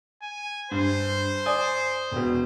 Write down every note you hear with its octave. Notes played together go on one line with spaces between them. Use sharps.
G#5
G2 C5
D5 G#5 D#6
E1 B2